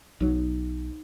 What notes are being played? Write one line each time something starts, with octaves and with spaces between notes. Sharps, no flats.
B1 F#3 D#4